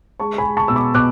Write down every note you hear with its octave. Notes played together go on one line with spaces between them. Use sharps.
G#3 A5 C#6
G#5 B5
G#3
A5 C#6
B2 E6
B5 D6
B2 D6 F#6